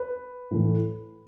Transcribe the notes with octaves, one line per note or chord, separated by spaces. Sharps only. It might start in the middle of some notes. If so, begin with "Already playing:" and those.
Already playing: B4
A2 E3 A3